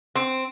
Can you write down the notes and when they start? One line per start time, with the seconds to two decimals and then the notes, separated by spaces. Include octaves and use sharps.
0.15 C4